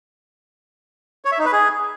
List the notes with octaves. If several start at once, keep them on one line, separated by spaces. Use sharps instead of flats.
C#5
E5
D#4
B4
G#4